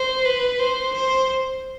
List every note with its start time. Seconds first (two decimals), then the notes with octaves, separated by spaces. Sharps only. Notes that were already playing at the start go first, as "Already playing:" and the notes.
Already playing: C5
0.25 B4
0.59 C5
0.94 C5